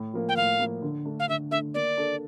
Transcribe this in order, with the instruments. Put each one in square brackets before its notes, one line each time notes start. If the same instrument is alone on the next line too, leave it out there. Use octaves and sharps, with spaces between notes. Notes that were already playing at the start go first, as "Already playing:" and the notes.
Already playing: [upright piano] A2
F3 A#3
[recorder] G5
[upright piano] A2 [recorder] F5
[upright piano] F3 A#3
D3
A3 D4
[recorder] F5
[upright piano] D3 [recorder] E5
[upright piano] A3 D4 [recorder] E5
[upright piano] A#3 [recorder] D5
[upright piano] D4 A4